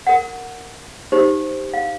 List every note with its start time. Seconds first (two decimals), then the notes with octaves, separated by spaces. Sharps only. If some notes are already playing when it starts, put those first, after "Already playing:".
0.07 A#4 F#5
1.12 D#4 G4 C5
1.74 F5